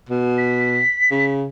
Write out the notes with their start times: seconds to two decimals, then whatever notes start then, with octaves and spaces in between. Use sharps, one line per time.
0.09 B2
0.37 B6
1.11 C#3